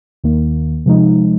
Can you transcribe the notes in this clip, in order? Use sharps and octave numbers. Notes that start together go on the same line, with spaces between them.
D#2 D#3 A#3
C3 F3 G#3 D#4